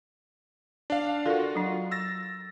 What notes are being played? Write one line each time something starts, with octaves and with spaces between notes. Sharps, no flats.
D4 F5
F4 F#4 A4 A#4 D5
F#3 D4
E6 A6 A#6